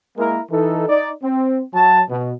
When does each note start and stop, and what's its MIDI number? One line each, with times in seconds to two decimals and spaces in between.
0.17 0.40 56
0.17 0.40 58
0.17 0.40 64
0.17 0.40 70
0.51 0.86 52
0.51 0.86 63
0.51 0.86 69
0.88 1.10 63
0.88 1.10 74
1.23 1.61 60
1.74 2.01 54
1.74 2.01 81
2.09 2.32 47